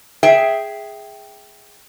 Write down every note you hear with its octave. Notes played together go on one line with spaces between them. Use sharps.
G#4 E5 G5